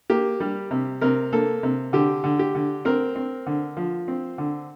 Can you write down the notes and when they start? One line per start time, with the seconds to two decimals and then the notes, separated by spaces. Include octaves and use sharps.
0.10 A#3 G4
0.40 G3
0.71 C3
1.01 C3 A#4
1.33 A#3 A4
1.63 C3
1.93 D3 G4
2.24 D3
2.39 G4
2.55 D3
2.85 C4 A#4
3.16 C4
3.47 D3
3.77 F3
4.08 C4
4.38 D3